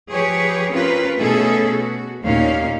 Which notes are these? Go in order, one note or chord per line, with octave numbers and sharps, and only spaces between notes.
F3 G4 G#4 B4 C#5
C4 C#4 F4 A#4 B4
B2 A3 C#4 E4 G#4 A4
F#4
D#2 A#2 A#3 C#4 D#4 F5